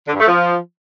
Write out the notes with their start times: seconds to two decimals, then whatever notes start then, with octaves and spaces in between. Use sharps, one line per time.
0.08 D3
0.14 G2
0.20 A3
0.26 F3